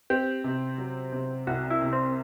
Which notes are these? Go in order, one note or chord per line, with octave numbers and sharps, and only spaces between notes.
C4 G4
C3
F#3
C3
C2 F#4
E4
C3
C4